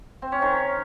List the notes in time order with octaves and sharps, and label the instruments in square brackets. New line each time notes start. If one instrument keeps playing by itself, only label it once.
[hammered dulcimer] C4
C#4
D#3